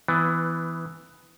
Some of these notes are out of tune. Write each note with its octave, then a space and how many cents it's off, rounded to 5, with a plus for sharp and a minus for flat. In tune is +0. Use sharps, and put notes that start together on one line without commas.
E3 +0 B3 +20